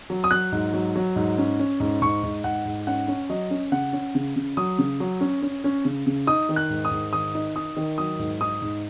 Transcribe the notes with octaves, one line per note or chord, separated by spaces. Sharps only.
F#3
D#6
F#3 F#6
G#2
F#3
F#3
G#2
C#4
C#4
G#2
G#2 C#6
G#2
G#2 F#5
G#2
C#4 F#5
C#4
F#3 D#5
C#4
C#3 F#5
C#4
C#3
C#3
F#3 D#6
C#3
F#3
C#4
C#4
C#4
C#3
C#3
D#4 D#6
D#3
F#6
G#2
D#6
G#2
D#3 D#6
D#4
D#4 D#6
D#3
F#3 D#6
G#2
D#4 D#6
G#2